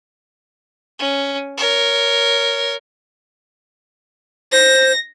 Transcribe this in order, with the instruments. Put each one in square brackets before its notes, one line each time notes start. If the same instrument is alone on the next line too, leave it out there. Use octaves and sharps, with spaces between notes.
[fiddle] C#4
A#4 C#5
[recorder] C5 [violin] A#6